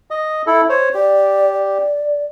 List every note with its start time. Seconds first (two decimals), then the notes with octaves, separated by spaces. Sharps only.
0.11 D#5
0.47 E4 A4
0.69 C5 C#5
0.94 G4 D5
1.53 D5